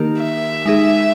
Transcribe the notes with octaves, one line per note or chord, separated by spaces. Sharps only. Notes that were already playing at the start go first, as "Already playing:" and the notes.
Already playing: D#3 A#3 D#4 G4 A#4
E5
G#3 D#4 G#4